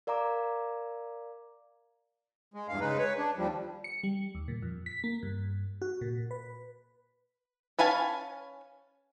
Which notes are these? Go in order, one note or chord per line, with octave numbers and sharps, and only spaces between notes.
A#4 D5 F5 A#5 D6
G#3
E2 G2 F5
C#3 G#3 D#4 B4
B4 C#5
D4
D#2 F3 G3
C#7
G3
D#2
A#2
F2
B6
A#3
G2
F#4
A#2
B4
C#4 B4 F5 G#5 A5